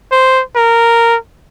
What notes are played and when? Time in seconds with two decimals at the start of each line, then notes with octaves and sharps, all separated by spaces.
0.12 C5
0.56 A#4